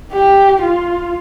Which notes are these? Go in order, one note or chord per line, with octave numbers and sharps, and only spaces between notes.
G4
F4